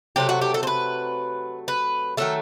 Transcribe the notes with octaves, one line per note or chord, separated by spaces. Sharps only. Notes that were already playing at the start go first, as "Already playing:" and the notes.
C3 F#3 A3 G4
F#4
G4
A4
C5
B4
B4
D#3 F#3 A3 A4